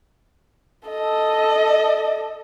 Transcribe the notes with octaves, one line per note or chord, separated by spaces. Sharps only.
A4 D#5